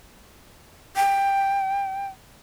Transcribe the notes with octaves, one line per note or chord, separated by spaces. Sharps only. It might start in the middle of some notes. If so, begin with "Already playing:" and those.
G5